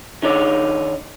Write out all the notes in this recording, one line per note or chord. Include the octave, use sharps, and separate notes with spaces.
D#3 D4 D#4 C#5 D5